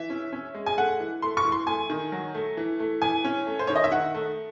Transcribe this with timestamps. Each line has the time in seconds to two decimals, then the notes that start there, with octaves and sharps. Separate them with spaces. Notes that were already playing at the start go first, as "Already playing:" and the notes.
Already playing: E3 E5
0.10 C#4
0.33 C#4
0.54 G#3
0.66 G#5
0.77 A3 F#5
1.00 E3
1.22 A3 C6
1.37 C#6
1.45 E3
1.52 C6
1.67 A3 G#5
1.90 D#3
2.12 F#3
2.35 A3
2.57 E3
2.80 A3
3.02 E3 G#5
3.24 C#4
3.47 A3
3.59 C5
3.67 D#3 C#5
3.76 D#5
3.84 E5
3.91 D#3 F#5
4.15 A3